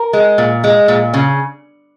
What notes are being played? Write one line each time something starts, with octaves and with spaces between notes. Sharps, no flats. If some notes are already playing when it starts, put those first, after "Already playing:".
Already playing: A#4
G#3
A#2
G#3
A#2
C#3